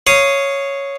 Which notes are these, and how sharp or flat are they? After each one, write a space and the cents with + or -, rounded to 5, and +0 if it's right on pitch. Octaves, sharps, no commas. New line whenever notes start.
C#5 +0 F5 -15 D#6 +0